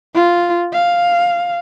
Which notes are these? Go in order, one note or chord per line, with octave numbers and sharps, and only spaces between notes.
F4
F5